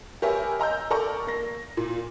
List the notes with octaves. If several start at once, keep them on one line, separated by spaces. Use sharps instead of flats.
G4 A#4 B4 C#5 E5 G#5
D#5 A#5 E6 G6
A4 A#4 D5 A#5 C#6
A#3 A#6
A#2